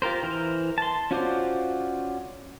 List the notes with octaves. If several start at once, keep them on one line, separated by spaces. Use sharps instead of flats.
F4 G4 A#4 C5
E3 A#4 C5
A5 C6
C#4 F4 F#4 C5 D5